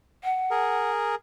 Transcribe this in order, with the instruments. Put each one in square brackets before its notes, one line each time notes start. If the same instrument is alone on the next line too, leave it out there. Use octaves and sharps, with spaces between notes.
[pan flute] F#5
[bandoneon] G#4 A#4